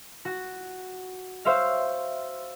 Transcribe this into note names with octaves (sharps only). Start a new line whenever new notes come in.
F#4
C5 C#5 E5 F5